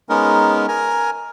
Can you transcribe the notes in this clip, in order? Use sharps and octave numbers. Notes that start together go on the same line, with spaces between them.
G#3 B3 C#4 D#4 A#4
A#4 G#5 A#5